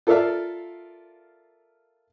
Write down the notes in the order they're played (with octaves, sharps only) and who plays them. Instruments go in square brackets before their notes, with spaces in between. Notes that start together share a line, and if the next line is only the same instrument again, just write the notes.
[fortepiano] F4 A4 A#4 D5 E5 F5